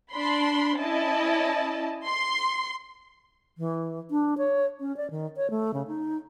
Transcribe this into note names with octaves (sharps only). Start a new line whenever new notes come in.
D4 B5 C6
C#4 E4 D5 D#5 A5
C6
E3
D4
C#5
C#4
D5
D#3
C#5
A3
C#3
D#4